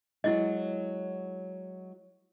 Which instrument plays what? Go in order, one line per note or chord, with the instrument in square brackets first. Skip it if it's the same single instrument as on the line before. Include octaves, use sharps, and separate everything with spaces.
[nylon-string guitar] F#3 G#3 [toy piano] E4 D#5